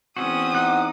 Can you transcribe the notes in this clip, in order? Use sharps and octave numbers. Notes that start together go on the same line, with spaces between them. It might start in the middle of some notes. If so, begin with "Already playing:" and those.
E2 C4 C#4 F#4 D#6
D#4 F#5